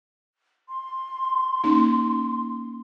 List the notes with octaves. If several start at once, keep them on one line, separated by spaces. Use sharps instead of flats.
C6
A#3 C#4 D#4